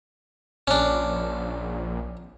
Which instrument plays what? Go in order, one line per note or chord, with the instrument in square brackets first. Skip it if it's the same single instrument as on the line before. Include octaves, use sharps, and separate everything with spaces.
[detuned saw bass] A#1 [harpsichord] C#4 D4